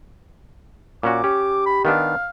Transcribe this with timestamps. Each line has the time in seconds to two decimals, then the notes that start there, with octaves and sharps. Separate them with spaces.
1.03 A#2 C#4 F#4 D6
1.24 C#4 G4
1.66 B5
1.85 D#3 B3 D4 F5